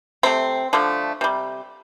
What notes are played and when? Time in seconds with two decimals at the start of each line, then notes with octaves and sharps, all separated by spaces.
0.23 C3 A3 C4
0.73 D3 F3 A3
1.21 C3 G3